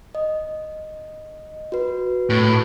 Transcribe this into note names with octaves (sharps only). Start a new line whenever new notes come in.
D#5
F#4 B4
A2